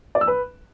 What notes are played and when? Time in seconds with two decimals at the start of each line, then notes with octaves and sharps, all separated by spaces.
0.15 D5
0.21 E6
0.27 B4